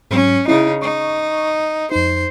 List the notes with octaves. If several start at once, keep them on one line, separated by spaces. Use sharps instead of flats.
G#2 F#3 C#4
C#3 C#4 D#4 E4
D#4 C#6
F2 D#4 C5